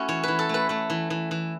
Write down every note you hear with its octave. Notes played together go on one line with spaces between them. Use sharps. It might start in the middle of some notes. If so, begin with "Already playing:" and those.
Already playing: A3 C#4 E4 F#4 A4
E3 C#5
E3 B4
A4
A3 B4
A3 B4
E3
E3
E3